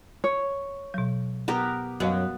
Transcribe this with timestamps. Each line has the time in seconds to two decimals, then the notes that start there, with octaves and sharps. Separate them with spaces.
0.24 C#5
0.94 B2 F#3
1.48 B3 G4 A#4
2.00 F#2 B3 F#4 D#5 F5